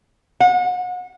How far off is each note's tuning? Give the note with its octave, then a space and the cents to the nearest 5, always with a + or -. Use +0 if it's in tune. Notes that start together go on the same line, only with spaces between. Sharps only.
F#5 -35